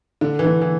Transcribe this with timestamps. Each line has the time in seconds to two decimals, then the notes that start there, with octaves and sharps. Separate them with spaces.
0.21 D3
0.39 E3
0.44 D3
0.61 E3